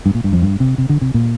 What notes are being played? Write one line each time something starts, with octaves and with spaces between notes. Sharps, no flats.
G2
A#2
G2
F2
G2
C3
C3
D3
C3
A#2